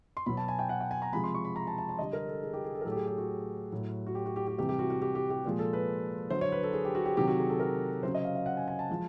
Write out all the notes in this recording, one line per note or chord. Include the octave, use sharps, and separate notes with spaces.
C6
B2 F#3 B5
A5
G#5
G5
F#5
G5
G#5
A#5
C3 F3 G#3 B5
C6
C#6
B5
A#5
A5
A5
A5
D3 G3 D#5
A#4
A4
G#4
G4
G#4
A4
A#4
A2 F#3 A4
G4
G#4
G4
F#4
A2 F#3
F#4
G4
F#4
G4
G4
C3 E3 G3 G4
G4
F#4
F#4
G4
G4
G4
A#2 F3 G#3
A4
B4
D3 F#3 C5
C#5
B4
A4
G#4
G4
F#4
G4
C3 D#3 F#3 G4
F#4
G#4
A4
A#4
C#3 F#3 C5
D#5
F5
F5
F#5
G#5
G#5
A5
F3 G#3